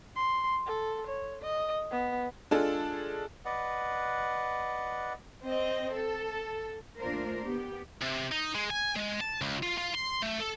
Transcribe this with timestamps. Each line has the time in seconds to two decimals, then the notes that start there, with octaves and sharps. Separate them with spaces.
0.15 C6
0.66 A4
1.07 C#5
1.42 D#5
1.91 B3
2.51 G#3 D4 F4 G#4 A4
3.45 B4 D5 D#5 F#5
5.44 C4 D#5
5.92 A4
6.99 D#2 A3 D4 F4 A#4 C5
7.44 B3 G4
8.01 C3
8.32 D#4
8.55 G#3
8.70 G#5
8.96 G#3
9.21 A5
9.41 C#2
9.63 F4
9.78 F4
9.95 C6
10.23 A3
10.41 A4